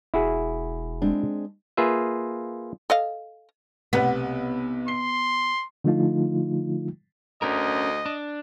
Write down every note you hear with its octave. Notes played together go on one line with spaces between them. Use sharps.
E1 E4 F#4 G#4
G#3 C4 D4
A#3 F4 G#4 B4 E5
A4 D#5 F5
B1 C3 B3 B4
C6 C7 G7
D3 F3 A3 D#4 F4
D2 C#4 A#4 D#5
D4